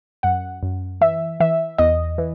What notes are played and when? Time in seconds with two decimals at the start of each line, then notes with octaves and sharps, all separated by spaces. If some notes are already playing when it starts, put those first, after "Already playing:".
0.23 F#2 F#5
0.63 F#2
1.01 E3 E5
1.40 E3 E5
1.78 E2 D#5
2.18 E3